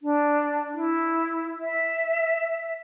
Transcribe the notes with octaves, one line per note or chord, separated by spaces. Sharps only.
D4
E4
E5